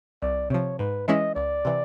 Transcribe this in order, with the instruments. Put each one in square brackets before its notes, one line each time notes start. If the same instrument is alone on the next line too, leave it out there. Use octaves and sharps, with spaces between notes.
[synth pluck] C2 [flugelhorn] D5
[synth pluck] C3 F3 [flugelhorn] C#5
[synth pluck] G#2 [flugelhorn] B4
[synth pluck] E3 G#3 C#4 E4 [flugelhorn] D#5
[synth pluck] C#2 [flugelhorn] D5
[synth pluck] C3 E3